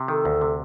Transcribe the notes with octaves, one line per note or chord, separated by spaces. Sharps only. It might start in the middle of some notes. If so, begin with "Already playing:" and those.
Already playing: C3
D#3 A4
D2
C3